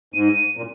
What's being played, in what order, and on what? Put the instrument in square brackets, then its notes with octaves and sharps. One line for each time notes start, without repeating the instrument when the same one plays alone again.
[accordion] G#2 [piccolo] D#7
[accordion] A#2